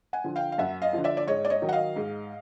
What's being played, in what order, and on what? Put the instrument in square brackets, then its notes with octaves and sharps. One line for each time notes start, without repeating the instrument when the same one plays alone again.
[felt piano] F#5 G#5
D3 F3
F5 G5
F5
F#2 E5 F#5
D#5 F5
D3 F3
D5 E5
D5
G#2 C#5 D#5
D5
C#5 D#5
D#3 F#3
F#5
D#5 F5
G#2